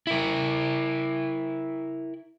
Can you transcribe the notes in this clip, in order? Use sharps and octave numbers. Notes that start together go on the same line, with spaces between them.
E4 A#4